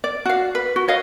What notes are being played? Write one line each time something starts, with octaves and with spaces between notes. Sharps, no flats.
D5
F#4 F5
B4
F#4
C#5 D#5 F5